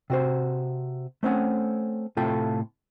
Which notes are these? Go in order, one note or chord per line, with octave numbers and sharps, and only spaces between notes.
C3 F#4 C5
A3 C4 C#4 F#5
A2 C3 A3 F4 A4 G5